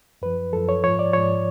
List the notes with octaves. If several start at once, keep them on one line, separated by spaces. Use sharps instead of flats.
F#2 F3 B4
F#2 F3 A4
C#5
G#2 F3 C#5
D5
F3 C#5
G#2